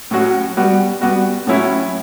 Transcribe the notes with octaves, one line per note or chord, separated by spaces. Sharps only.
A2 F#3 C#4 F#4
G3 B3 F#4
G3 B3 F#4
A2 F#3 C#4 E4